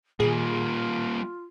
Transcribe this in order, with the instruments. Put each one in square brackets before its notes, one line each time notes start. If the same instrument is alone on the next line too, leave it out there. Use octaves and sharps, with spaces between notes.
[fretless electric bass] A#2 D#3 [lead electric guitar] G3 A#3 [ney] F4 [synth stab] G#4